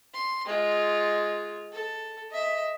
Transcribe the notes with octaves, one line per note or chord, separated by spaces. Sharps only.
C6
G#3 F4
A4
D#5 E5